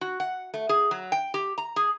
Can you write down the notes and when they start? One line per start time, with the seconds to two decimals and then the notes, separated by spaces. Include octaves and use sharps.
0.01 F#4
0.20 F#5
0.54 A3
0.69 G#4
0.91 F#3
1.12 G5
1.34 G4
1.58 A#5
1.76 G#4